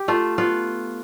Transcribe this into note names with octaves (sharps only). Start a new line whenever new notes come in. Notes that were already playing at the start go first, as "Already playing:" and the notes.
Already playing: G4
A3 F4
B3 F4